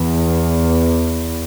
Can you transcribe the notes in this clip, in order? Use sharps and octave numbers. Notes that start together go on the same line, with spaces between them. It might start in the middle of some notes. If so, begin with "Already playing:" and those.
Already playing: E2